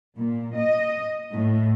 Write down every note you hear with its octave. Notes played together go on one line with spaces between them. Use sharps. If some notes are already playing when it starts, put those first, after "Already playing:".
A#2
D#5
A2